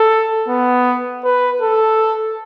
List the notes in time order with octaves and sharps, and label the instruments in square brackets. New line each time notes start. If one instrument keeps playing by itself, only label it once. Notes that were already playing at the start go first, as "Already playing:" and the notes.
Already playing: [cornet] A4
B3
B4
A4